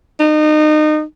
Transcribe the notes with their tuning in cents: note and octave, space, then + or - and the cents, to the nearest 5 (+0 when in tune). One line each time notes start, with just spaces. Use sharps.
D#4 -30